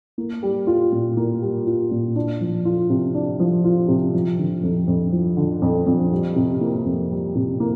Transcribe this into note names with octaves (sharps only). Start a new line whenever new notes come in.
A#3
G3
F4
A#2
A#3
G3
F4
A#2
D4
F3
F4
C3
D4
F3
F4
C3
F3
D3
F2
F2
F3
D3
F2
F2
G3
C3
A#3
F2
G3
C3
A#3